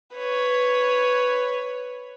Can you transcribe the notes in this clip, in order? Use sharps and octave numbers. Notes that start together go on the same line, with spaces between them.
B4 C#5